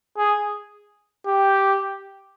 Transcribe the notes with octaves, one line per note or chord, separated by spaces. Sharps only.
G#4
G4